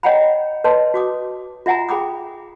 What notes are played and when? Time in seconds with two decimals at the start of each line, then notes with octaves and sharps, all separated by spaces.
0.03 C#5 D#5 F#5 G5 A#5 B5
0.64 B4 C#5 D#5 A5 C6
0.94 F#4 D6 D#6
1.66 F4 E5 F#5 G#5 A#5
1.89 G#4 G5 B5 D6 D#6